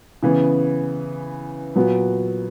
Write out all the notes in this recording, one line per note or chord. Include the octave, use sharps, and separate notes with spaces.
C#3 E3 B3
A#2 F#3 B3 F#4